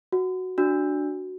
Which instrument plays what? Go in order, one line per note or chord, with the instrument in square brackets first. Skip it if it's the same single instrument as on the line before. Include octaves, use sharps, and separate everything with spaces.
[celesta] F#4
[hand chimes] D4 [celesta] F#4